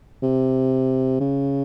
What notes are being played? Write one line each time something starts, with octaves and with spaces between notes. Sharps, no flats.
C3
C#3